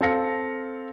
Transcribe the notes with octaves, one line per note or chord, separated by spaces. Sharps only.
C4 A4 F5 A#6 C#7